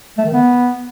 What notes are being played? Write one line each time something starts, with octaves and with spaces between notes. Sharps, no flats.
A3
D#3
B3